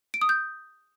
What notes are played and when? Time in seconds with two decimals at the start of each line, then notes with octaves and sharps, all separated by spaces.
0.14 D7
0.21 D#6
0.29 G6